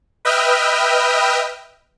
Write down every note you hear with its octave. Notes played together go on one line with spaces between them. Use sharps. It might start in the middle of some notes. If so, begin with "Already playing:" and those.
B4 D#5 E5 G5 D#6 F6